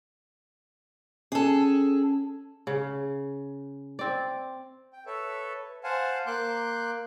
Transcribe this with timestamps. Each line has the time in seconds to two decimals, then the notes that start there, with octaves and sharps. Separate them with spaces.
1.32 C#4 G#4 A4
2.67 C#3
3.99 C4 D5
4.93 G5
5.06 A4 B4 C#5 E5
5.84 C5 F5 F#5 G#5 A5
6.27 A#3 C6 D6 F#6 G6